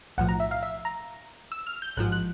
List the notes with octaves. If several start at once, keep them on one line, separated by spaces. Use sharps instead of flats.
B1 A2 F3 F#5
A#5
E5
F5
E5
A#5
E6
F6
G6
A1 G#2 F3 F#6
F#6